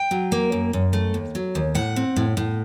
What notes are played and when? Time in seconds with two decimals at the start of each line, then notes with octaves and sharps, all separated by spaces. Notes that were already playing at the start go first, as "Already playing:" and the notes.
Already playing: G5
0.11 F#3
0.32 A#3
0.52 F#2
0.73 F#2
0.93 A3
1.14 D#2
1.35 F#3
1.55 D#2
1.75 A2 F#5
1.96 C4
2.16 A2
2.37 A2